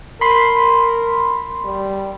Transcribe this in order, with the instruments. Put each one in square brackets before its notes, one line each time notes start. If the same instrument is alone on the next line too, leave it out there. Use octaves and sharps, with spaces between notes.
[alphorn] A#4 [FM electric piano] B5 C6
[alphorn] G3